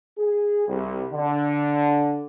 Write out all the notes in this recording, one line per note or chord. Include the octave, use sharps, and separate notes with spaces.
G#4
C2
D3